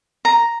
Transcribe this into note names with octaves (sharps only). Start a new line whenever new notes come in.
A#5